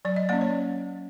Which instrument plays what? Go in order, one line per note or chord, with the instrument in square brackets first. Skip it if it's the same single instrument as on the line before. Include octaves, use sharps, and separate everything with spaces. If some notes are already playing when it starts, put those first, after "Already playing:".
[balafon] F#3 D5
D#5
A#3 C#4 D5
C#5